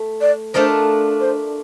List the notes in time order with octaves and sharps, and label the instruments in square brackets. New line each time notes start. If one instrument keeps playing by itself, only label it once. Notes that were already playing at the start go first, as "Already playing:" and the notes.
Already playing: [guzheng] A3
[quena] D5
[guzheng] A3 D4 F4 A#4 D#5 [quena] C5
[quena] C5